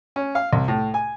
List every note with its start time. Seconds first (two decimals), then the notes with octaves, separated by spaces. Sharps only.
0.16 C#4
0.35 F5
0.53 C2
0.68 A2
0.94 G#5